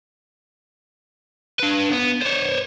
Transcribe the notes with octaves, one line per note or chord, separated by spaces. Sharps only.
D4 B4
B3
C5 C#5